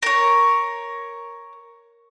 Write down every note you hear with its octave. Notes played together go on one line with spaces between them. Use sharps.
A#4 C#5